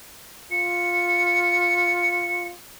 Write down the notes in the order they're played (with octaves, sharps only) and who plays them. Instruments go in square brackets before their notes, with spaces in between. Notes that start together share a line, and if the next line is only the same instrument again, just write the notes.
[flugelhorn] F4 [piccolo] C#7